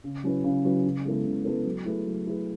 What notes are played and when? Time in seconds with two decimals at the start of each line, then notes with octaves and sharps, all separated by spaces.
0.04 C#3
0.24 F#3 C#4 E4 B4
0.44 C#3
0.64 F#3 C#4 E4 B4
0.85 C#3
1.05 G#3 B3 E4 A4
1.25 C#3
1.45 G#3 B3 E4 A4
1.65 F#3
1.85 A3 E4 G#4 B4
2.06 F#3
2.26 A3 E4 G#4 B4